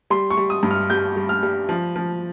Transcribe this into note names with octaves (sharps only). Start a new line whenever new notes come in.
G3 C6
C#6
G3
D#6
G2
F6
G3 G6
G3
F6
G3
F3
F3